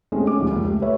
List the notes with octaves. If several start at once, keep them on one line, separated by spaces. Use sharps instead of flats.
G#3 A3 C4 C#4 G4
G#3 C#4 D6
F1 A#1 D#2 A#2 F3
C#2
A3 G4
B4 C#5 E5